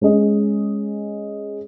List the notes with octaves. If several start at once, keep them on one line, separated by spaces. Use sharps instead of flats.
G#3 C#4 G#4 D#5